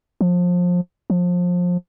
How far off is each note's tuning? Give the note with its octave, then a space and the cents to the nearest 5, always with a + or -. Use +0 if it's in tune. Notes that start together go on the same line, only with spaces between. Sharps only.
F3 +25
F3 +25